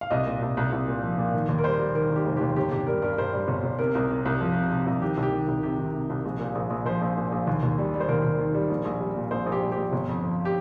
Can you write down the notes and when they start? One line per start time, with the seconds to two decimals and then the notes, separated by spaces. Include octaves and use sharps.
0.01 F5
0.10 C2 D#5
0.26 A#2
0.42 C2
0.57 C2
0.72 C2
0.88 A#2
1.03 F3
1.18 A#2
1.34 D#3
1.49 D#2
1.59 A#4
1.64 G3 C5
1.79 G3
1.95 D#3 A#4
2.10 D#3
2.16 G4
2.25 F1
2.37 D#2 G4
2.56 G1 G4
2.72 G1 G4
2.87 G3 A#4
3.02 G2 A#4
3.18 G2 C5
3.33 G3
3.48 G1
3.64 G1
3.79 C3 A#4
3.95 C2
4.10 C3
4.25 C2
4.41 F3
4.56 C3
4.72 C3
4.86 C2
5.01 D#3 G4
5.17 C2
5.23 G4
5.33 D#3
5.48 C2
5.63 C3 G4
5.79 D#3
5.94 C3
6.10 C2
6.25 A#1
6.40 A#2
6.55 A#1
6.70 A#1
6.85 F3 C5
7.01 A#1
7.17 A#2
7.32 A#1
7.47 D#2
7.63 D#2
7.79 G3
7.94 G3
8.00 C5
8.09 D#2 A#4
8.24 D#2
8.39 D#3
8.55 G3
8.70 A#1
8.85 A#1
9.01 G3
9.16 A#2
9.31 A#1 C5
9.46 A#1
9.52 G4
9.62 G3
9.72 G4
9.77 A#1
9.93 G1
10.08 F2
10.23 F3
10.45 G4